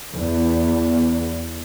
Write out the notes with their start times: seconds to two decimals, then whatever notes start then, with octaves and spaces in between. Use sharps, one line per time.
0.13 E2 B3